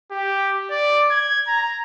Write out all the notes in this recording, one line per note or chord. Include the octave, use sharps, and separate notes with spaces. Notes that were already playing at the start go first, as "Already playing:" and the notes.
G4
D5
G#6
A#5